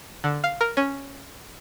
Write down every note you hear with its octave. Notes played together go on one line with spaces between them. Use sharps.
D3
F5
A#4
C#4